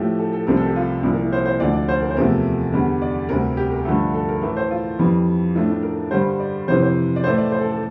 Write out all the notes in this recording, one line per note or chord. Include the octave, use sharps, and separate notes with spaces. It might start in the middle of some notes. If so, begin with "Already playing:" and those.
Already playing: A2 F3 A3 G4
A4
A4
C2 C3 F3 A3 A#4
A4
G4
F4
C2 A#2 F3 E4
A#4
E4
C5
C5
D2 D3 F3 A3 D5
D5
C5
A#4
C5
E2 C3 F3 A3 A#4
E2 D3 G3
D5
D2 C3 G3 A#4
G4
A#4
G2 D3 F3 A3 A4
A4
A#4
A2 E3 A3 A#4
C5
F4
F2 E3 G3
A2 F3 A3 D4
D4
A#4
G2 D3 G3 C5
D5
F2 C3 E3 C5
C5
D5
A2 E3 A3 C5
D5
C5
A4
A4